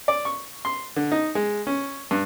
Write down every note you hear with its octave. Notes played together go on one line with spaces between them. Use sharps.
D5
C#6
C6
D3
D#4
G#3
C#4
G2